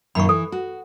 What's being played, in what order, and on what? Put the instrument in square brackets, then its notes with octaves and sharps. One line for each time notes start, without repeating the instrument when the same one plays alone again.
[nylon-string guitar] F#2 A#2 D#3 [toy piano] B5 C#6
[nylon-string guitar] E3 [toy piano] A4
[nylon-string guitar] F#4